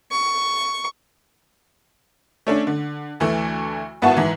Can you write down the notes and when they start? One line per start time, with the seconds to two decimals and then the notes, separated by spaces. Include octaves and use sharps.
0.12 C#6
2.47 A3 C#4 D4
2.67 D3
3.20 D2 E3 A3
4.02 G#1 B3 E4 F#4 A5 C#6
4.17 G#2 E3